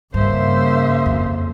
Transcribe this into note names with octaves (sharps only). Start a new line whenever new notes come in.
G2 C#3 A#3 C5 E5
F2